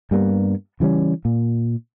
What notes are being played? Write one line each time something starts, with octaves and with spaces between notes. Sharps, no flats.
G2 G3 A#3 B3
C#3 E3 G3 C#4
A#2